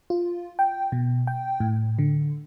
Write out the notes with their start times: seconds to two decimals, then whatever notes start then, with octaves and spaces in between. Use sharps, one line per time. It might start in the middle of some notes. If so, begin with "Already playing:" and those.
0.10 F4
0.59 G5
0.92 B2
1.27 G5
1.60 A2
1.99 D3